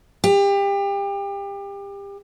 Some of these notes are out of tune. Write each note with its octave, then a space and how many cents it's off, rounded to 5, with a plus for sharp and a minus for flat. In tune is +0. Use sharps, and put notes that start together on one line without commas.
G4 +30